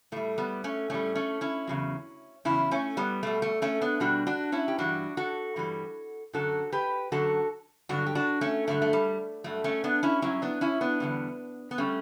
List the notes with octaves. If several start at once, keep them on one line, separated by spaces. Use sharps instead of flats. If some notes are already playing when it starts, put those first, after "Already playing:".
A2 G3 A3
G3 B3
A3 C#4
A2 G3 A3 C#4
A3 C#4
C#4 E4
E2 C#3 F#3
E2 C#3 F#3 C#4 E4
A3 C#4
G3 B3
B2 G3 A3
A3
A3 C#4
B3 D4
B2 G3 D4 F#4
D4 F#4
C#4 E4
G4
G2 E3 G3 D4 F#4
F#4 A4
G2 E3 G3
F#2 D3 F#3 F#4 A4
G4 B4
F#2 D3 F#3 F#4 A4
G2 D3 F#3 D4 F#4
G4
D4 F#4
A3 C#4
G2 D3 F#3 A3
A3
G3
G2 F#3 A3
A3 C#4
B3 D4
C#4 E4
G2 F#3 C#4 E4
B3 D4
C#4 E4
B3 D4
E2 D3 G3
B3
D3 G3 A3 C#4